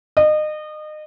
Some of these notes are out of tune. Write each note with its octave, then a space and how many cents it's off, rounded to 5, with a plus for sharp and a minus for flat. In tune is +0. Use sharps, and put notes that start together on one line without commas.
D#5 -30